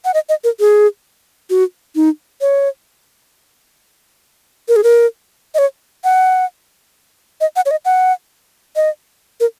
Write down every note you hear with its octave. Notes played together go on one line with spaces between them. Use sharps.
F#5
D#5
D#5
A#4
G#4
F#4
D#4
C#5
A#4
G#4
A#4
D#5
C#5
F#5
D#5
F#5
C#5
D#5
F#5
D#5
A#4